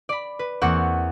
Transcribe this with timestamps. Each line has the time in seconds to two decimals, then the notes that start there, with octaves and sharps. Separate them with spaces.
0.09 D5 B5
0.39 B4
0.61 E2 A#3 C4 F#5 C#6 E7